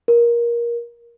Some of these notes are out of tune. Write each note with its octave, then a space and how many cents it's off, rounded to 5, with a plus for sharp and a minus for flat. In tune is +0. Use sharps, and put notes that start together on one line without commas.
A#4 +20